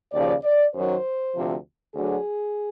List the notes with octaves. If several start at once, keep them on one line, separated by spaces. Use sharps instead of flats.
D#2 C#3 F3 D5
D5
F#2 D#3 F#3 C5
D2 C3 F3
D2 D3 F#3 G#4